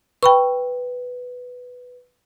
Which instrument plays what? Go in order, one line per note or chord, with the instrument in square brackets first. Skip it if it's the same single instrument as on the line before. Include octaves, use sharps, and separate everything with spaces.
[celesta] B4 [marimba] G5 B5 C#6